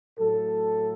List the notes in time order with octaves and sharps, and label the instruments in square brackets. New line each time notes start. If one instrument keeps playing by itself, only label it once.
[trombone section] A2 F#3 A3 A4